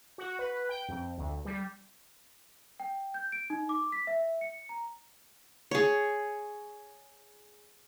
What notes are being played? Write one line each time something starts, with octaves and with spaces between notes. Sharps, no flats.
F#4
B4
G5
F2
D2
G3
G5
G6
D7
D#4
D6
B6
E5
C#7
A#5
G#4 C#5